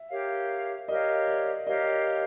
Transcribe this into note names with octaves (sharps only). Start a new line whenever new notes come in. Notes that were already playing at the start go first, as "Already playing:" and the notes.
Already playing: E5
G4 A#4 C#5 F5
G4 A#4 C#5 D#5 F5
D5
G4 A#4 C#5 D#5 F5